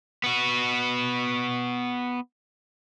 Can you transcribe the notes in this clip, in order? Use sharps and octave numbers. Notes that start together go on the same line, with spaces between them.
B3 F#4